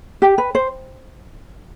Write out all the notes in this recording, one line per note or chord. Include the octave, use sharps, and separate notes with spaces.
G4
B4
C5